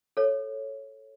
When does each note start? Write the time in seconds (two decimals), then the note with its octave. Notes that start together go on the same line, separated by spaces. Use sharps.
0.17 A4 C#5